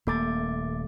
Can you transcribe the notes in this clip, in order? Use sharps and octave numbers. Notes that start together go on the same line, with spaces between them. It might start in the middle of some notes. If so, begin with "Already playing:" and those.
D#1 A3 A#3 D6 A6